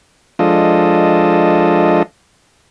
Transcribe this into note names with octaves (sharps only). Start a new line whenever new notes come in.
F3 G#3 D4 F4 A4 D#5